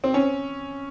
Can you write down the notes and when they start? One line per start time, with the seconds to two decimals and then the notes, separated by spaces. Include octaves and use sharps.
0.04 C4
0.14 C#4